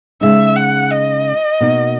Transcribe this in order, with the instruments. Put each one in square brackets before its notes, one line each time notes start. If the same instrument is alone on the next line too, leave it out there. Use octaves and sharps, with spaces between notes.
[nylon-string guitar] C#3 G#3 D#4 [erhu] E5
[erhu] F#5
D#5
[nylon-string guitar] B2 A#3 D#4 F#4